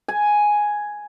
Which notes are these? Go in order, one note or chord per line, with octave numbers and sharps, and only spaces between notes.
G#5